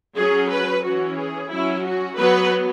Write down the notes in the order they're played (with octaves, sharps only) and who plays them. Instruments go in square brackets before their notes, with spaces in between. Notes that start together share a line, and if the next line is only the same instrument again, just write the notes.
[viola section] F#3 C#4 G#4
B4
E3 C#4 F#4
G#4
F#3 C#4 E4
F#4
F#3 B3 B4